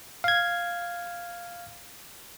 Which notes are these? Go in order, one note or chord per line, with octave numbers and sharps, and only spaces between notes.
F5 G#6